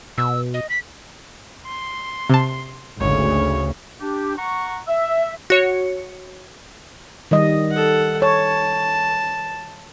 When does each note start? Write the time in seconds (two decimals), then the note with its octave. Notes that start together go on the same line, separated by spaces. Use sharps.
0.18 B2 E6
0.54 D#5
0.70 B6
1.66 C6
2.30 C3 A5
3.01 G#1 D2 C#3 C#5
4.00 D4 G4
4.37 F#5 A#5 C#6
4.88 E5
5.50 F#4 C#5 C#7
7.31 D#3 G3 D#5
7.71 A4 F#5
8.22 C#5 A5